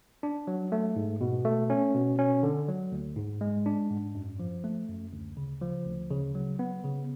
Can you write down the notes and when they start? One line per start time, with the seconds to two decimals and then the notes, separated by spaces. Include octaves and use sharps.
0.23 D4
0.47 F#3
0.72 A3
0.96 G#2
1.21 B2
1.45 A3
1.70 C#4
1.95 B2
2.19 C#4
2.43 D3
2.68 F#3
2.92 D2
3.17 G#2
3.41 G#3
3.66 D4
3.90 G#2
4.15 F#2
4.40 F3
4.64 A3
4.88 F#2
5.12 D2
5.37 C#3
5.62 F3
5.86 D2
6.11 C#3
6.35 F#3
6.59 B3
6.84 C#3